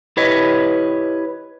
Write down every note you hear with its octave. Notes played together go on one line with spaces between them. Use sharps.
E4 G4 B4 C#5 D#5